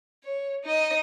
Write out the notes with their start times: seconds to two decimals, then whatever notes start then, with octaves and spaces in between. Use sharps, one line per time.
0.24 C#5
0.64 D#4 D#5